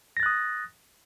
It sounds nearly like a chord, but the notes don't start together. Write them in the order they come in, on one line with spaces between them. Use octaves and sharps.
A#6 A6 F#6 D#6